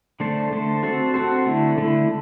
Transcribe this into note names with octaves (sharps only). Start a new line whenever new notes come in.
D3 A3 D4 A4 C5
D3 A3 D4 A4 C5
C4 F#4 A4 C5
C4 F#4 A4 C5
D3 A3 E4
D3 A3 E4